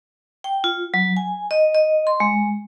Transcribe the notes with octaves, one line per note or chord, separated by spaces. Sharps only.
G5
F4
F#3
G#5
D#5
D#5
C6
G#3